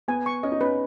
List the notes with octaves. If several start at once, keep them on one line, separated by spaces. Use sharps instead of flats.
B3 G#5
C#6
C#4 D#5
D#4
C#4 B4